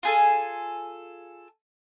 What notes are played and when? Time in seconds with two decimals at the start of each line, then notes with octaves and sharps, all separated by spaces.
0.03 F4 G#4 A4